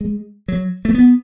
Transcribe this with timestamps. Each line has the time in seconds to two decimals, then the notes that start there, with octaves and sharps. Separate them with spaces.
0.01 G#3
0.48 F#3
0.85 A3
0.95 B3